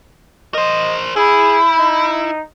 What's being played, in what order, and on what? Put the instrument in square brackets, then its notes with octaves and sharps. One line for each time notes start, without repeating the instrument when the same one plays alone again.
[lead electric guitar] A#4 C5 [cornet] D#5
[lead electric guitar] E4 [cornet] G#4 [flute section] B5 G6
[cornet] D#4